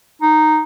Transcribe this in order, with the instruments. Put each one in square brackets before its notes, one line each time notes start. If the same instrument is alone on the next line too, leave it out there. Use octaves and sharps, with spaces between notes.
[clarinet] D#4